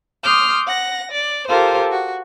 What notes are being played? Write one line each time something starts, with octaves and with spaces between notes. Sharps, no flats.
C6 D6 D#6 F6 G6
F#5 A#6
D5
F4 G4 A4 A#4 C5
F#4